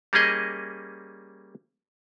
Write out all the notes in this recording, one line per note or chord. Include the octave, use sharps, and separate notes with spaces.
G3 A#3 C#4 G#4 D#5